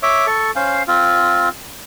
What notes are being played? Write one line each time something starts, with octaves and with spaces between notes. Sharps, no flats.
C#5 E5 D6
A4 C#6
C#4 C5 F5
C4 F4